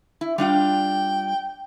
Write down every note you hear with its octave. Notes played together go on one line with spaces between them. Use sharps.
E4
G3 D4 F4 G5